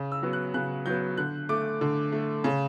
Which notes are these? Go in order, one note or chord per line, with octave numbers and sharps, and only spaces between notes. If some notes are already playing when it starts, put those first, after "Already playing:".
Already playing: C#3
E6
F#3 B3
F#6
C#3 F#6
F#3 B3 G6
D3 F#6
A3 D6
D3
A3
C#3